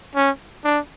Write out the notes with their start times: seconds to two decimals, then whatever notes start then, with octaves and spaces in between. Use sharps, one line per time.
0.15 C#4
0.64 D4